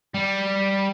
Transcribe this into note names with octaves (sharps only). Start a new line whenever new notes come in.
G3